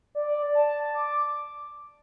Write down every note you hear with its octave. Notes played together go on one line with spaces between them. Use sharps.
D5
A5
D6